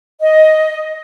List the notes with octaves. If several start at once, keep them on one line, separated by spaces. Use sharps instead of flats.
D#5